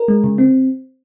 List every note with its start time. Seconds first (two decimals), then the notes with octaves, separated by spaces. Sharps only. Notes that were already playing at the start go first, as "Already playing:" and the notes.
Already playing: A#4
0.08 G#3
0.24 C#3
0.38 C4